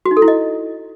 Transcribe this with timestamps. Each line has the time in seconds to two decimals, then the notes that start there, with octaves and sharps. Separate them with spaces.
0.06 F#4
0.11 D#4
0.17 A4
0.22 E4
0.28 D#5